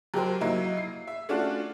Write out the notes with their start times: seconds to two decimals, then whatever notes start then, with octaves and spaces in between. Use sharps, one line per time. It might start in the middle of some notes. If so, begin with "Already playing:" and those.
0.14 F#3 G4 A#4 C5
0.41 F#3 A#3 D#4 E4
0.77 C7
1.08 E5
1.29 A3 C#4 D4 F4 F#4